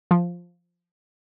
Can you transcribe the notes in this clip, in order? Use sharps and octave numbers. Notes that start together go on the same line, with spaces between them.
F3